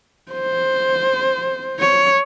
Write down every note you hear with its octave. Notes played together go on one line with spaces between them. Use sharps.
C5
C#5